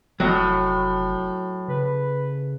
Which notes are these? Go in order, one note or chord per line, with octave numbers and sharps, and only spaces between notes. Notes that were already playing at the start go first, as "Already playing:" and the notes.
F1 A2 F#3 D#5
C#3 B4